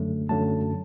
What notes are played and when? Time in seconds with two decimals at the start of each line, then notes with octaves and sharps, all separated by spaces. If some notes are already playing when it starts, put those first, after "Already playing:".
Already playing: F#2 D3 F#3 A3
0.29 F#2 D3 F#3 A3 A5